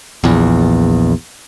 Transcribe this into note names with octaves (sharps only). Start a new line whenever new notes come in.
A#1 E2